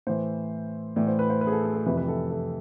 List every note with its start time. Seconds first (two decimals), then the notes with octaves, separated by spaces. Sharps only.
0.07 A2 E3 C5
0.96 A2 E3 D5
1.07 C5
1.19 B4
1.30 C5
1.41 B4
1.47 G#4
1.52 A4
1.64 G#4
1.75 A4
1.86 F2 C3 E3 B4
1.97 B4
2.08 A4
2.31 A4